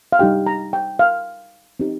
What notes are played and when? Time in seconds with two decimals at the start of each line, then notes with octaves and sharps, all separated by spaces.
0.12 F5
0.19 G3 D#4 G4 G5
0.46 A#5
0.73 G5
0.99 F5
1.80 C4 D#4 G4